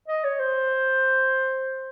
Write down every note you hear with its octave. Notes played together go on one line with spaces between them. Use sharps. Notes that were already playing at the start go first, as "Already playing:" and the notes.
D#5
C#5
C5